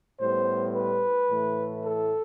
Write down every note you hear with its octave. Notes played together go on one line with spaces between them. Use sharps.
A2 G3 B3 C5
B4
A2 E3 A3
A4